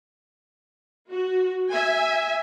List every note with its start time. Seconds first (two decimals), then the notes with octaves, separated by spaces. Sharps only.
1.11 F#4
1.69 E5 G#5